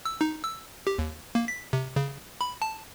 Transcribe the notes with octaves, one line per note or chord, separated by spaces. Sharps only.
E6
D#4
E6
G4
D#2
A#3
B6
C3
C#3
B5
A5